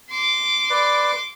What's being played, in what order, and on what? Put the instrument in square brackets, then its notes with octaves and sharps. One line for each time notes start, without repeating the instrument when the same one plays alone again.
[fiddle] C6 D6
[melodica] B4 D5